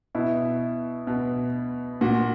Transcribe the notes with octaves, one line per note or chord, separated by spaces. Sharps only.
B2 E4
B2
A#2 F#4